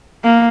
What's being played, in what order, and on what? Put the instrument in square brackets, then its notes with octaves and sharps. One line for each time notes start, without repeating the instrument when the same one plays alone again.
[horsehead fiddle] A#3